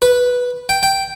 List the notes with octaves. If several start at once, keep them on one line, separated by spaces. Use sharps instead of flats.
B4
G5
G5